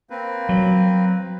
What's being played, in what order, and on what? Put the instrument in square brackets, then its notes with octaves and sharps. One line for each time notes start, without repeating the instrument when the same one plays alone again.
[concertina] A#3 C4 B4
[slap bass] F#3